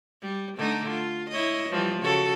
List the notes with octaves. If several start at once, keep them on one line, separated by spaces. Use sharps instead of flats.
G3
D3 A3 D#4
F4
E4 C#5 D#5
E3 F3 G3
C#3 F#4 A4